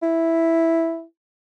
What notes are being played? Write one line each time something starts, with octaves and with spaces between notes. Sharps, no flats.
E4